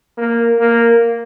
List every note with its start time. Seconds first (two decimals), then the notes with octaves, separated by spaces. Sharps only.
0.18 A#3
0.59 A#3